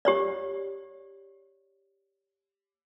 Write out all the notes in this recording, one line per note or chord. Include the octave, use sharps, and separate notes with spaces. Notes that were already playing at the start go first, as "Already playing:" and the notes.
G4 C#5 D5